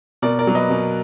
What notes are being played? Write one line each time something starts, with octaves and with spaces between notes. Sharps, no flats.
B2 A#4 D5
A#4 D5
F#3 A#3
B4 D#5
B2